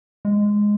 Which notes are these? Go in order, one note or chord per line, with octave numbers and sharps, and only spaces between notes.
G#3